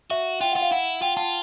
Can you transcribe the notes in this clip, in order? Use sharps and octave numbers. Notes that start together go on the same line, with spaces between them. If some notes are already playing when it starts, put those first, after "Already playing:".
F#4 E5
F4 G5
F4 F#5
F5
E4 F#5
F4 G5
F4 A5